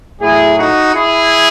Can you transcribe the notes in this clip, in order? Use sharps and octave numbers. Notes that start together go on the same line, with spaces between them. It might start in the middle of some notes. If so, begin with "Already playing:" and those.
A2 F#3 A3 E4 G#4
D#4 F#4
E4 G#4